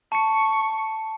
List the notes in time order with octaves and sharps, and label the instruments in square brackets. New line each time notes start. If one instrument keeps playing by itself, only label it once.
[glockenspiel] A5 C#7 [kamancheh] C#6